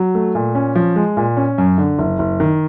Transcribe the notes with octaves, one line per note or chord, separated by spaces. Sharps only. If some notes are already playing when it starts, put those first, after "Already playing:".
Already playing: F#3
A3
A#2
C#4
F3
G#3
A#2
C#4
F#2
D3
F#1
F#1
D#3